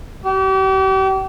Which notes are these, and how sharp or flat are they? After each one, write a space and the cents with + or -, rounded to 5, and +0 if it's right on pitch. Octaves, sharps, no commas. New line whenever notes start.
G4 -40